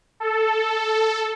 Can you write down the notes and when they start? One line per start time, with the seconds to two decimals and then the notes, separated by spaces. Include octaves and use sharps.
0.20 A4